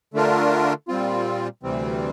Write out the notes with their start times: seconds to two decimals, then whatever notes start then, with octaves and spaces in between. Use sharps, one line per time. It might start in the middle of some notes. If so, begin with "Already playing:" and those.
0.14 D3 A3 D4 F4 A#4
0.88 A#2 G3 C4 F4
1.63 D2 C3 E3 G3 C4